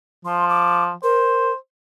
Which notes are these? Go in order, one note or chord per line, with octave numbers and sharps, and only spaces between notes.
F3 C6
D6
A#4 C5